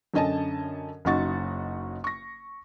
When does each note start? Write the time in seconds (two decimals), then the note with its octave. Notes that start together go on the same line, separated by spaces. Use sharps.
0.14 F#2 D3 C#4 D#5 G#5 A5
1.05 F#1 C#3 D#4 F#4 C#6 A6
2.04 C#6 A#6